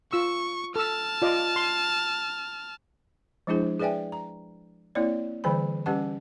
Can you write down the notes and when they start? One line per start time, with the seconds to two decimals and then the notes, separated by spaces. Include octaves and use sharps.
0.13 F4 C#6 E6
0.76 A4 A5 E6 F6
1.22 F4 D5 D#5
1.56 C6
3.47 F3 G#3 D4 E4 G#4 C5
3.80 G#4 B4 D5 E5 G5 G#5
4.12 A#5
4.95 A#3 C4 E4 C#5 D5
5.44 D3 E3 G3 C5 B5
5.86 G3 C#4 G4 B4 F#5 A5